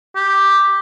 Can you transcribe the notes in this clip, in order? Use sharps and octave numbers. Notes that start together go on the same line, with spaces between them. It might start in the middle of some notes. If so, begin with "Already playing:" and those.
G4